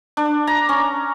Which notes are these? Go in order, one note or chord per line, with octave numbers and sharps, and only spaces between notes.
D4
A#5
C#4